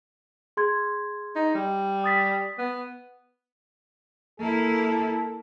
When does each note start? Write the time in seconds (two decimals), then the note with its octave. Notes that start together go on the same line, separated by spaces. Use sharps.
0.57 G#4 C6 G#6
1.36 D#4
1.55 G3
2.04 D#6 A6 B6
2.58 B3
4.39 A#3 E4 A4